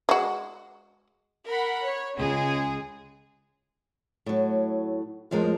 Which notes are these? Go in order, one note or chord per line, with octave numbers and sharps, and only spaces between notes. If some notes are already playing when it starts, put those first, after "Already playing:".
G#3 F#4
A#4 F#5 B5
C#5
C#2 C#3 G#3 G#4
A2 F#3
F2 A2 F3 G#3 A#4